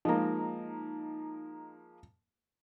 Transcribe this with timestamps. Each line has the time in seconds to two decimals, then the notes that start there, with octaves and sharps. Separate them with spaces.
0.05 F3 G#3 A#3 D#4 A#5